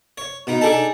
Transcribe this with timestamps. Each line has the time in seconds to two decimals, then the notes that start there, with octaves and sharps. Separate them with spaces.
0.18 C#5
0.47 B2 B3 D#4
0.61 D4 D#4 G#4 A4 A5